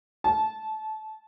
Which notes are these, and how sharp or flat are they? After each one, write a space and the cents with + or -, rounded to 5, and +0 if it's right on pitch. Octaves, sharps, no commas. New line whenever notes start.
A5 -20